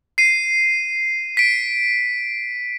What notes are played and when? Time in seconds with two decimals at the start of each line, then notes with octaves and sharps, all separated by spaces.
0.18 C7 D#7
1.37 B6 D7